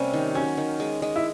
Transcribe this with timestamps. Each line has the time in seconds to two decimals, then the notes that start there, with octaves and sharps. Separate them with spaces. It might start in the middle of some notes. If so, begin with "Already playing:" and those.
Already playing: C3 G3 A#3 C#4
0.14 D#3
0.35 F#3 C#4
0.58 D#3
0.80 G#3
1.02 G#3
1.16 E4